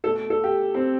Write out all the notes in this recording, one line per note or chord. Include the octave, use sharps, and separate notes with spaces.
B2 A3 A4
A4
G4
C4